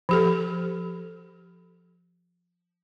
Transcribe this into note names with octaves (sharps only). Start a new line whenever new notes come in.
F3 G4 A4